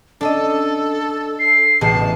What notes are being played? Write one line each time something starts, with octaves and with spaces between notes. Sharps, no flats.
D4 A4 D#5 F5 A5
C7
A1 B2 G#4 G5 A5